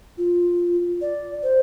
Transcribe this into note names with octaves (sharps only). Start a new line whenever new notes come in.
F4
D5
C5